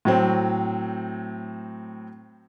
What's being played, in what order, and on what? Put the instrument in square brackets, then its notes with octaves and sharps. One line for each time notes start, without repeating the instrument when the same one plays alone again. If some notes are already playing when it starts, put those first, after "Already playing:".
[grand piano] A2 F#3 C4